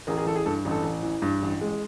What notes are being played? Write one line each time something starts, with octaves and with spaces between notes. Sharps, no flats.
A1 G#4 A#4
G#4 A#4
E3 A4
G#4
G2 A4
A1
A4
A1
E3
G2
A1
G#3